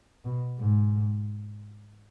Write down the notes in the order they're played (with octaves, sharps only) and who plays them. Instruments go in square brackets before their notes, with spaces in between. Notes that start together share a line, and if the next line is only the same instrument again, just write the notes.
[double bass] B2
G#2